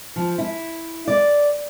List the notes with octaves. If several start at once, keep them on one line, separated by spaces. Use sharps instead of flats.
F3
E4
D5